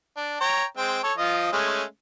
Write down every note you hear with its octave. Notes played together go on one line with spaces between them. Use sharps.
D4
C#5 G5 A#5
G#3 C4 G5
A4 C#5
F3 F4 D#5
G#3 A3 C#4